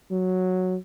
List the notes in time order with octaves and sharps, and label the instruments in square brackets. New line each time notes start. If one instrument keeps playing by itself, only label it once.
[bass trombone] F#3